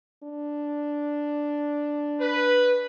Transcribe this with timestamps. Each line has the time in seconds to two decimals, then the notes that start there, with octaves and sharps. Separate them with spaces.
0.24 D4
2.21 B4